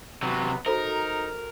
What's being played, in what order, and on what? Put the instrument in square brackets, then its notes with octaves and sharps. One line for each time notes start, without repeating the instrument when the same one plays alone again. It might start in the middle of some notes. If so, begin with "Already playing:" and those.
[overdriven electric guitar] C3 F#3 [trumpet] B3
[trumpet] D#4 [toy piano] F#4 A4 C5 [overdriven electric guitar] A#4